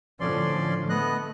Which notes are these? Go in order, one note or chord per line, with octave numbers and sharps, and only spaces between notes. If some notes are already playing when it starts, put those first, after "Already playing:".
A2 D3 F3 C#4 D5 C6
A3 B3 D#5 F#6